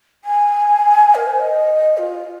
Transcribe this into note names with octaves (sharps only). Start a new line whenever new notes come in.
G#5
A#4
C5
D#5
F4